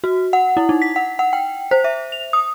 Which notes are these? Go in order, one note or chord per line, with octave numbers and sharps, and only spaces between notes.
F#4
F#5
E4
D#4
B6
F#5
F#5
G5
C5
E5
F7
D#6